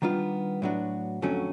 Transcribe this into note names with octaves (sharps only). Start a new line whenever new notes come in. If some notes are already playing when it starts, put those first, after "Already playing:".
D#3 G3 B3 D4 F4
A2 F#3 B3 D4 F#4
F2 D3 F#3 A3 C#4